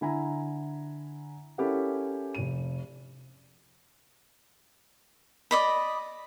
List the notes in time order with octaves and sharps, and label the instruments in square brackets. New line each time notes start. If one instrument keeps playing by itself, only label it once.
[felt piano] D3 E4 G#5 A#5
C#4 E4 G4 A4 A#4 F#5
F1 D#7
[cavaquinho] D5 D#5 B5